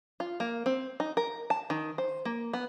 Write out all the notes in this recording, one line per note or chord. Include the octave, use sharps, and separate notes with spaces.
F4
A#3
C4
D#4
A#4
A5
D#3
C5
A#3
B3